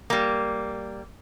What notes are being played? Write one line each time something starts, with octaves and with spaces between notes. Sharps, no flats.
G3 A#3